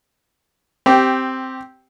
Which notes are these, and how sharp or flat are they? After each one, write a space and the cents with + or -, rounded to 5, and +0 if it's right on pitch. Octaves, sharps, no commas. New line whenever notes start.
C4 +0 G4 -10